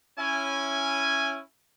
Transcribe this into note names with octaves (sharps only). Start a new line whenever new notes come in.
C#4 E4 G#5